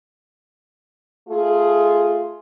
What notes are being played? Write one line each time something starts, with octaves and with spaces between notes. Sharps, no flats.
A3 F4 G#4